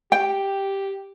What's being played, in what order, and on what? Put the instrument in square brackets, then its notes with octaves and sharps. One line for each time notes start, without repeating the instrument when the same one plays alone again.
[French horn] G4 [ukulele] G5